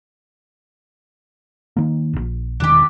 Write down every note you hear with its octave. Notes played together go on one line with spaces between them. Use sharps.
D#3 A#3
E1 A#1
E1 D#3 D4 G4